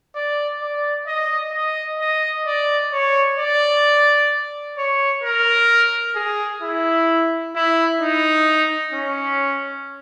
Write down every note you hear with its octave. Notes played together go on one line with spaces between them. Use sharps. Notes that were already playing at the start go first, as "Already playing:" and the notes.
D5
D5
D#5
D#5
D#5
D5
C#5
D5
C#5
A#4
G#4
E4
E4
D#4
C#4